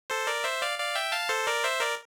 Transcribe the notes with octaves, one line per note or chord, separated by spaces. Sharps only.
A4 C5
A#4 D5
C5 E5
D5 F5
D5 F5
E5 G5
F5 A5
A4 C5
A#4 D5
C5 E5
A#4 D5